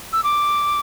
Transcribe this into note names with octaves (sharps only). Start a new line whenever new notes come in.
E6
D6